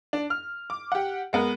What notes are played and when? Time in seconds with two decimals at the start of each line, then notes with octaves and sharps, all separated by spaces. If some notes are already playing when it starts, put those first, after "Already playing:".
0.13 D4
0.30 F6
0.70 D6
0.92 G4 F#5
1.33 G#3 B3 A#4